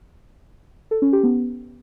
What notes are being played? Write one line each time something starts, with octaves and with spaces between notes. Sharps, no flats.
A4
C#4
G4
B3